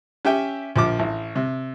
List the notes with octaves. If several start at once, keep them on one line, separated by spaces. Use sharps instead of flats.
C#4 G4 E5 G5
A#1 F3 D6
A1
C3